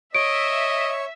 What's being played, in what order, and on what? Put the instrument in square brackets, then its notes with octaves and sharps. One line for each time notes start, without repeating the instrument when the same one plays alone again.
[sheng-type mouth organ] C#5 [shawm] D#5 [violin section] E5 [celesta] D7